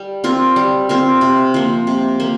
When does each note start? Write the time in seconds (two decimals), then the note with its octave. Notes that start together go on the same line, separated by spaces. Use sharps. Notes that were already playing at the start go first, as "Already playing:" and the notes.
Already playing: G3
0.24 C4 F4 A#4
0.56 G3
0.89 C4 F4 A#4
1.21 C3
1.54 F3 A#3
1.87 C3
2.20 A#3